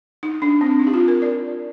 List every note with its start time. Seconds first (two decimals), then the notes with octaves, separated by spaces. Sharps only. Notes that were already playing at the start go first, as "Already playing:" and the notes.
0.23 D#4
0.42 D4
0.61 C4
0.79 D#4
0.87 G4
0.94 F4
1.08 A#4
1.22 D5